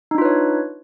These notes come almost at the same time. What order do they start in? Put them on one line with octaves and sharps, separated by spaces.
D#4 D4 F4 B4 C#5